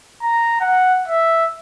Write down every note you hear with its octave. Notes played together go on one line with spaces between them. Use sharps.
A#5
F#5
E5